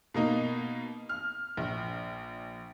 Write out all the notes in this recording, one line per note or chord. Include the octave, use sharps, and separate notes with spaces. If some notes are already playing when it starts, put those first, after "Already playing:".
B2 A#3 D#4
F6
A#1